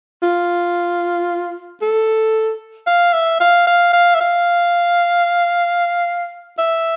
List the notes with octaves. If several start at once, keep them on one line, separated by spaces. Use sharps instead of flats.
F4
A4
F5
E5
F5
F5
F5
E5
F5
E5